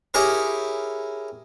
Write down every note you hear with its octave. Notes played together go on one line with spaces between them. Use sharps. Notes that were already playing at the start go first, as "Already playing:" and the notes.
E4 G4 G#4 A#4 C#5